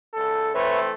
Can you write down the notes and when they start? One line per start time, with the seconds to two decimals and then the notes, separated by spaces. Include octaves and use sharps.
0.14 C#2 A4
0.55 E3 A3 C4 B4 C#5 E5